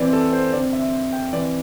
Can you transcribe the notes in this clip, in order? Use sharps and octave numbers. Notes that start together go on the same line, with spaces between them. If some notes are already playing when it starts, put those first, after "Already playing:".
Already playing: E3 C4 D5
A4
C5
D3 C4 D5
E5
G5
E3 C4 D5